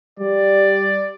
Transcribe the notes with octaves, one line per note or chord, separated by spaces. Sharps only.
G3 D5